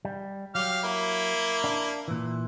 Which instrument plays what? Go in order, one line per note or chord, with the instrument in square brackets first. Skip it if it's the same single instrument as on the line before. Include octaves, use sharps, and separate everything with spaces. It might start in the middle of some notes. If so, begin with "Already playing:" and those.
[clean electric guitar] G3
[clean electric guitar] F#3 [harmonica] G4 F5 F6
[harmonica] A#3 E4
[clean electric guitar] D4
A#2 E3